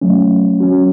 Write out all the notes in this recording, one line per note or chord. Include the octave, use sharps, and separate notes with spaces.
F#3 A3 C#4
F#3 C#4 F#4